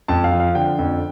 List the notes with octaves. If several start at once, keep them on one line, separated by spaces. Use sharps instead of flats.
F2 A5
F5
F3
F5
D3 G5
F2